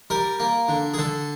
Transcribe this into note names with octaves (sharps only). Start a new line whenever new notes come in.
G3 A#4
A#3
D3
G#4
D3 A4